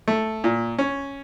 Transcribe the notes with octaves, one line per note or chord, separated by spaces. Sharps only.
A3
A#2
C#4